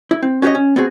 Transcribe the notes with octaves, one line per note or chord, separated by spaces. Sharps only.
E4
C4
C#4 F#4 G4 B4 C#5 D#5
C#4
B3 C4 F#4 G#4